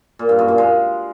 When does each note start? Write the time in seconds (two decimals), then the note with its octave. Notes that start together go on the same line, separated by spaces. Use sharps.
0.19 A#2
0.29 G2
0.39 F#2
0.48 A#2
0.58 G#3